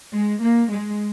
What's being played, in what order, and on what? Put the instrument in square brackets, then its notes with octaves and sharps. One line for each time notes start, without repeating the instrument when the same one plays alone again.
[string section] G#3
A#3
G#3